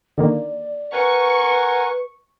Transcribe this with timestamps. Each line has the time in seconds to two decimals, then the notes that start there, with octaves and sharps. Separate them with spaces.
0.18 D3 D#3 A#3 D5
0.93 A#4 B4 F#5 G#5 C#6